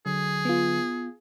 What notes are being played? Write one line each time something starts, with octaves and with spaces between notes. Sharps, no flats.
D3 F#3 G#4
B3 F4